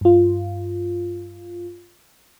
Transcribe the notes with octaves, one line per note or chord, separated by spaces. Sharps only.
G2 F4